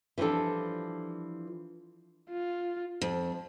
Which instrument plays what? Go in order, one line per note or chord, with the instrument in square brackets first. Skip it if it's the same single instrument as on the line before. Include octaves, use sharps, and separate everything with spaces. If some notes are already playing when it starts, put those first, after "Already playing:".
[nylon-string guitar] E3 F3 G3 D4 A4
[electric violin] F4
[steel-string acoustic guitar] F2